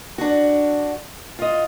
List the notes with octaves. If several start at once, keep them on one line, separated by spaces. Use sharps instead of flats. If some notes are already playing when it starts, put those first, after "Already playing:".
D4 F#4
F4 D#5